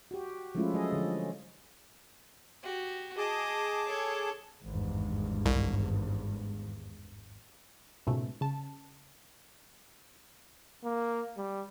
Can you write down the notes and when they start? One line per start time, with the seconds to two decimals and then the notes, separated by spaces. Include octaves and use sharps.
0.11 F#4 G4
0.55 F3 G#3 A3 C#4 E4 F4
0.74 F#3 G#4 A4 D#5
0.92 D3 F3
2.63 F#4 G4
3.18 G#4 D#5 A5 D6
3.88 A4 C#5
4.63 G#1 E2 G2
5.46 C2
8.07 C#2 G#2 B2 A3
8.41 C#3 A5
10.84 A#3
11.37 G3